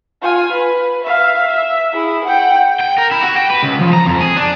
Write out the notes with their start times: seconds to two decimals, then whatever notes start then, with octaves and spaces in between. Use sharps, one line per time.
0.22 F4 G#5
0.52 B4
1.04 E5 F5
1.48 E5
1.93 E4 G#4
2.25 F#5 G5
2.80 G5
2.98 A#4
3.11 E4
3.23 F#4
3.35 G5
3.50 B4
3.63 C#2
3.80 F3
3.93 A#5
4.06 F2
4.21 G#4
4.37 D4